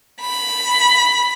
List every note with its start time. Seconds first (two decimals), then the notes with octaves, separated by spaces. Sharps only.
0.21 B5